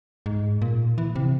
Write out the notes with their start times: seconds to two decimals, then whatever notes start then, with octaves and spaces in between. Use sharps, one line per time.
0.26 G#2
0.62 A#2
0.98 E3
1.16 C3